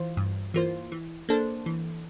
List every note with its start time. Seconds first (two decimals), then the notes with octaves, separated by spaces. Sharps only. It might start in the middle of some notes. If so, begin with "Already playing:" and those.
Already playing: E3 F4 C5
0.17 G2
0.54 E3 A#3 F4 C5
0.92 E3
1.29 A#3 D4 A4 C5
1.66 E3